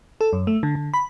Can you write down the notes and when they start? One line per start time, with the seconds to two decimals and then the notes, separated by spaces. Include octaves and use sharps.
0.21 A4
0.33 F#2
0.47 A3
0.63 D3
0.75 D3
0.94 B5